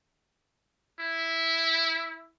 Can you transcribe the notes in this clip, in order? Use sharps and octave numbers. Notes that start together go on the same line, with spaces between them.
E4